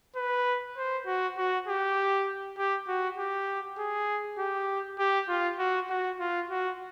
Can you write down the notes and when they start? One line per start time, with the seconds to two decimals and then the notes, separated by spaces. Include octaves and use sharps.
0.16 B4
0.78 C5
1.07 F#4
1.38 F#4
1.68 G4
2.58 G4
2.88 F#4
3.18 G4
3.79 G#4
4.39 G4
4.99 G4
5.29 F4
5.59 F#4
5.90 F#4
6.20 F4
6.50 F#4